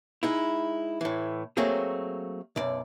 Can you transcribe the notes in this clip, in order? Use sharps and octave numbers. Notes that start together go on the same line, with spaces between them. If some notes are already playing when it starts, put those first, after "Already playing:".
G#3 D#4 E4
A2 E3
F#3 A3 A#3 C4 G#4
B1 F#2 D5